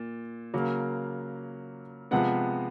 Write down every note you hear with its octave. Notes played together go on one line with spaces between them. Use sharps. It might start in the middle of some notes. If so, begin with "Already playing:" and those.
Already playing: A#2
C#3 F#3 A#3
C3 F3 G#3 B3 F#5